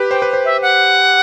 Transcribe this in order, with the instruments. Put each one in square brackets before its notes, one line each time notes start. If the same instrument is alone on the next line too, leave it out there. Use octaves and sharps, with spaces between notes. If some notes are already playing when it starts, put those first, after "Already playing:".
Already playing: [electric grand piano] G4 B4
[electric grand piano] C5 [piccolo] G5
[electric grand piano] B4
C5
[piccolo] E5
F#5